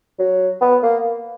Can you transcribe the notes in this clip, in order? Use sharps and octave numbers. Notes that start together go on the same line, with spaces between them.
F#3
B3
A#3